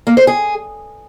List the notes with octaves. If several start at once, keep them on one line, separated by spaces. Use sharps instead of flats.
A#3
C5
G#4